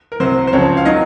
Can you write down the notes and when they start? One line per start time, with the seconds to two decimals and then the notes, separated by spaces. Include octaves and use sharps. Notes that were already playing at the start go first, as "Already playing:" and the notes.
0.12 A#4
0.20 C2 C3 F#3 C5
0.47 C5
0.52 C#2 C#3 F3 C#5
0.77 F5
0.85 D#3 F#3 D#5